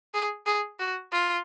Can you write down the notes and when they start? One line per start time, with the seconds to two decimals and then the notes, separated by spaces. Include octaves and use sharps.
0.14 G#4
0.46 G#4
0.80 F#4
1.12 F4